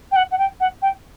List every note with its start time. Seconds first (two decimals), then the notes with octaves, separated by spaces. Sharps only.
0.11 G5
0.16 F#5
0.31 F#5
0.38 G5
0.60 F#5
0.82 G5